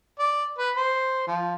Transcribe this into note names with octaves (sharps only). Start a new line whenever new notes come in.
D5
B4
C5
F3